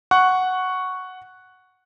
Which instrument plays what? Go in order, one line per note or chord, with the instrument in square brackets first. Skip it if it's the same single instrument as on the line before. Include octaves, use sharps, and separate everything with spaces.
[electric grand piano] F#5 C#6 F#6